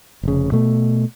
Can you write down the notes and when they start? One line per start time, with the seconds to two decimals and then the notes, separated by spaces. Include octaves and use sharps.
0.23 F1 C#3
0.52 B2 A3